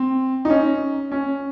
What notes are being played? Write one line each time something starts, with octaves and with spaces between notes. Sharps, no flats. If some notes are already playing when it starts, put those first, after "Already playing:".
Already playing: C4
D#4
C#4
C#4